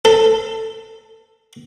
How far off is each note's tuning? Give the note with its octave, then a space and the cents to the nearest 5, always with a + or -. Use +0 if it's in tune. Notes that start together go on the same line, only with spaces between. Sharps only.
A4 +20